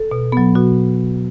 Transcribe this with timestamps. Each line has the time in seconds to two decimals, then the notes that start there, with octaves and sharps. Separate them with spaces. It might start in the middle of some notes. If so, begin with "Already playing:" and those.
Already playing: A4
0.11 B2
0.32 F#3 B3
0.55 B2 F#4